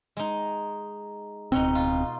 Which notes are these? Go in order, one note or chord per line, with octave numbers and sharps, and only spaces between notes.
G#3 D#4
D1 B2 C4 D#4
F4